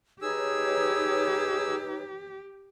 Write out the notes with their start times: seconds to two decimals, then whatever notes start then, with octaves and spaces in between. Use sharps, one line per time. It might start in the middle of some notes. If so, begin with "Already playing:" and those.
0.22 D#4 G4 G#4 B4 C#5 E6